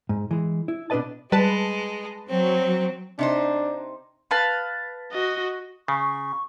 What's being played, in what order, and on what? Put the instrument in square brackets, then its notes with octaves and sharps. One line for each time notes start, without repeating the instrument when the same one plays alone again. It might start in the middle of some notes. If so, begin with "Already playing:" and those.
[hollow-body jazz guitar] G#2
E3 G#3
E4
B2 D4 A4 B4 D#5 A5
[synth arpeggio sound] G3 [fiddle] G#3 [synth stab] B4 A5
[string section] F#3 [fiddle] C4
[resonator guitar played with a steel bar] C3 D#4 C5 [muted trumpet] D4
[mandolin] B4 F5 A5
[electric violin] F#4 D#5
[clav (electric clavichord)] C#3 [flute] C#6